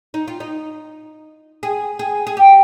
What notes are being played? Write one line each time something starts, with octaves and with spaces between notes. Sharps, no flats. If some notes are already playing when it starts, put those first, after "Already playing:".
D#4
F4
D#4
G#4
G#4
G#4
G4